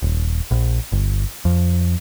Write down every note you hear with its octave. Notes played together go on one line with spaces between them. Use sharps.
D#1
A#1
G1
F2